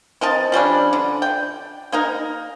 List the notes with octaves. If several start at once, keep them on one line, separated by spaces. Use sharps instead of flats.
C4 A#4 D#5 A5
F3 G3 C#4 D4
D3
G5
A#3 D#4 A#4